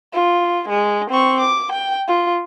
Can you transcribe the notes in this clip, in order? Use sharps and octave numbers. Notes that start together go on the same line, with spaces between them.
F4
G#3
C4 C#6
D6
G5
F4